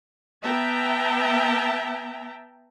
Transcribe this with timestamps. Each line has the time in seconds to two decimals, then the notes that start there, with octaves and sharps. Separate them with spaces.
0.44 B3 E5 G5 A5 A#5